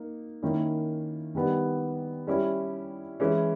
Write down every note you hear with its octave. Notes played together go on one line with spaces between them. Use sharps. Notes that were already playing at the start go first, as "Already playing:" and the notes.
Already playing: A#3 D#4
D#3 A#3 C#4 E4
D#3 G3 B3
G3 C#4 E4
E3 G#3 C#4 E4